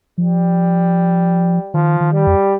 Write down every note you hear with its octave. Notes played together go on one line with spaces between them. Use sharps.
F3 G3
D#3 F3
D#3
G3
F2